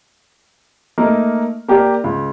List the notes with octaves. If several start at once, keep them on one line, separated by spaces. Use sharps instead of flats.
A3 A#3 D#4 A#4
A#3 G4 A#4 D5
C#2